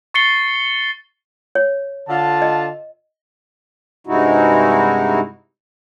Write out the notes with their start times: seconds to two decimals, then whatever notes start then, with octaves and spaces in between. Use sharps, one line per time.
0.14 C#6 A6 C7 C#7 G7
1.55 C#5
2.09 D3 F4 A5
2.42 D#5
4.07 G2 C3 G#3 D#4 E4 F#4